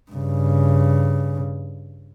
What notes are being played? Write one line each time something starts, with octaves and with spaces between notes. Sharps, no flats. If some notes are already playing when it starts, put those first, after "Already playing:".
G2 C#3